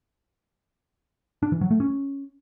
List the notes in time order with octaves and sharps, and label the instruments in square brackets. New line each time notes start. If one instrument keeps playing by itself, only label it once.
[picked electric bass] D4
E3
F#3
A3
C#4